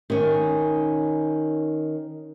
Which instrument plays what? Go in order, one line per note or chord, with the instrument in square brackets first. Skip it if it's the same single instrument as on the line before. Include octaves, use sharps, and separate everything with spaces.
[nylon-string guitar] D#3 C#4